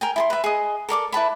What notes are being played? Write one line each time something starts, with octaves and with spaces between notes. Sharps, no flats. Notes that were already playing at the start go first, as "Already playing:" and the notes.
A#4 G5 G#5
E4 G#5 C6
B4 E5
G#4 D#5
A4 A#4 D5 D6
E4 B4 A5 B5